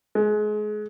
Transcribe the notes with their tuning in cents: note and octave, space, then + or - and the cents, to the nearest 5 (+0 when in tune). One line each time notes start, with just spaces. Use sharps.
G#3 +30